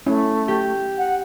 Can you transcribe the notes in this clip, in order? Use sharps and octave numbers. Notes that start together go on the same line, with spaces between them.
A3 C#4 E4
G4
F#5